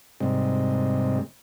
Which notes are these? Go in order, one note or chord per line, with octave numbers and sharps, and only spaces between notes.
G#2 C3 G3 G#3 C4